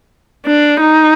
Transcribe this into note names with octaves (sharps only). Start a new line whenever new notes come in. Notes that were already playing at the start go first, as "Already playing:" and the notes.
D4
D#4